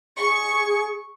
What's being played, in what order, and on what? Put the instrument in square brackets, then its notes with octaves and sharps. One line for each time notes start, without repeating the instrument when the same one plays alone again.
[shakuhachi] G#4 [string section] C#6